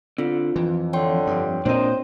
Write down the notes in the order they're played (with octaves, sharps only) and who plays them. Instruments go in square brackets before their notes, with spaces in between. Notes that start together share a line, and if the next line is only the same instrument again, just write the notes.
[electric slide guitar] D3 [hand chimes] C4 F4
[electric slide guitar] F2 [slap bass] E3
[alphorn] D3 [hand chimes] C#5 G5 C6
[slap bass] G2
[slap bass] A#2 G3 C4 [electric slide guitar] D4 A#4 D#5 [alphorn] C5